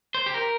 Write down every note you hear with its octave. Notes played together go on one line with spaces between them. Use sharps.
C5
G4
A#4